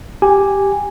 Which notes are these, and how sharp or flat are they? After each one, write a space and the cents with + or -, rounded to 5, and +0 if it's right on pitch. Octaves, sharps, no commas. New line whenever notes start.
G4 +0 G#5 -10